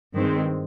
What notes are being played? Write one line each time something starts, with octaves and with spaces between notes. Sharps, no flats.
G2 D#3 G#3 C4